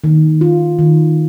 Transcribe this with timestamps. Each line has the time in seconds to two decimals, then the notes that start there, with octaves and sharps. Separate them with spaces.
0.04 D#3
0.41 F4
0.79 D#3